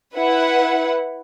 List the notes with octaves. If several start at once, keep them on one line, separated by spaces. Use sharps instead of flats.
E4 B4 F#5